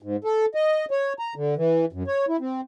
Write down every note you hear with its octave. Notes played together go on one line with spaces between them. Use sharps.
G#2
A4
D#5
C#5
A#5
D3
E3
F#2
C#5
E4
C4